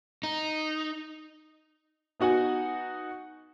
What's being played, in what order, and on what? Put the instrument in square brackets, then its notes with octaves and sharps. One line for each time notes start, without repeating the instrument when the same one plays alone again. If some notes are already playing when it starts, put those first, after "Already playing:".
[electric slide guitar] D#4
[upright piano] B3 D#4 F#4 F#5 G#5